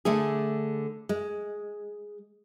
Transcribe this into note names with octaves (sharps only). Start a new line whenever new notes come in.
D3 A3 D4 G#4
G#3